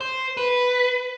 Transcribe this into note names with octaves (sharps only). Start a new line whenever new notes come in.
C5
B4